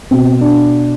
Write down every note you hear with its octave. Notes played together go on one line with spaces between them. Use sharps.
B2 C4
D4